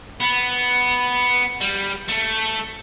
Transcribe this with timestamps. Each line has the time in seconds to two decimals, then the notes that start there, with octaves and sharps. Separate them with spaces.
0.20 B3
1.61 G3
2.08 A3